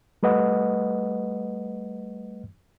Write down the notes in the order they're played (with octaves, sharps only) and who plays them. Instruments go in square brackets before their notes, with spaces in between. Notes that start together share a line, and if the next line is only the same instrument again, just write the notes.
[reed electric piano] G3 A3 B4 D#5 F#5